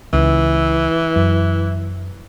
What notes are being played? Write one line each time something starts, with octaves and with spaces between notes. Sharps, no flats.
C#2 E3
F#2